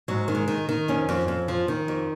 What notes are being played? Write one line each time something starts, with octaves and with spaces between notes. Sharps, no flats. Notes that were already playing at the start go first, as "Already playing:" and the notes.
G#2 F#3
D#3
G#3
D#3
D#3
F2 C#4
F2
F2
F3
D#3
F2